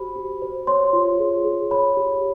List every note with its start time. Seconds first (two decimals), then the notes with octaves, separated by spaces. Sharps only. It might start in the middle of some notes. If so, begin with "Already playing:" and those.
Already playing: F#4 G4 C5 B5
0.16 G4
0.42 C5
0.67 C#5 C6
0.93 F4
1.19 G#4
1.45 G#4
1.71 C#5 B5
1.97 G4